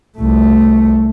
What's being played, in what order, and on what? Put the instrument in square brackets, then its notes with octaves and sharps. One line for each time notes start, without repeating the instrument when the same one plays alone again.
[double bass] C2 A3